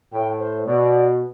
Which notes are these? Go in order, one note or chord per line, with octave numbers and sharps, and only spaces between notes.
A2 G5
C5
B2 D5